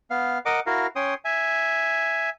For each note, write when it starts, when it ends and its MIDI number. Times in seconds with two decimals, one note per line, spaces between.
0.10 0.38 59
0.10 0.38 77
0.45 0.60 70
0.45 0.60 75
0.45 0.60 78
0.45 0.60 86
0.66 0.87 64
0.66 0.87 66
0.66 0.87 70
0.66 0.87 77
0.96 1.14 61
0.96 1.14 73
0.96 1.14 79
0.96 1.14 84
0.96 1.14 87
1.25 2.30 76
1.25 2.30 80